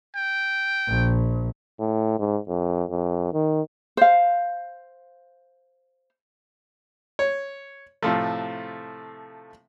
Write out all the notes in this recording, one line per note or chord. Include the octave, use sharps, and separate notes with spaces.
G5
A#1
A2
G#2
F2
F2
D#3
C5 F5
C#5
A2 C3 F3 A3